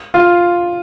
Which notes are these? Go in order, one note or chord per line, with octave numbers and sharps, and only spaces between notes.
F4